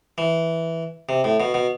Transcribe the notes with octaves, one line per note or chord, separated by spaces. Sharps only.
E3
C3
A2
B2
B2